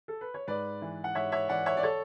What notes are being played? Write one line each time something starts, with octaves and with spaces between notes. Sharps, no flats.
A4
B4
C#5
G#2 B4 D5
E3
F#5
G#2 C#5 E5
C#5 E5
E3 D5 F#5
C#5 E5
D5
A4 C#5